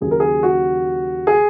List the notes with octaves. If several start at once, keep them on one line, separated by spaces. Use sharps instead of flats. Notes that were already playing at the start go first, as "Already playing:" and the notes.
D#2 C#3 F#3 G#4
A#4
G#4
F#4
G#4